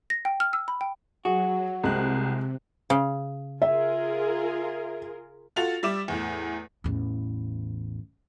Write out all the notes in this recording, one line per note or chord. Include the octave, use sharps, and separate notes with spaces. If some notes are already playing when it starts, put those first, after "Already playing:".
A#6
G5
F6
E6
B5
G5
F#3 F#4 G#4
C2 C3 G#3 C4 F#6
C#3
F4 G#4 A#4 E5
F4 F#4 A4 A6 F7
G3 E5 D6 E7
E2 A2
A1 E2